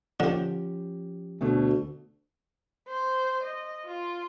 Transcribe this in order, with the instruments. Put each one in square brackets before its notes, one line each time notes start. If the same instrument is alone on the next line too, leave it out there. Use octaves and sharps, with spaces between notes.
[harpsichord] D3 [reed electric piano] F3 C#4 G4
[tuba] D2 [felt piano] B2 A3
[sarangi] C5
D#5
F4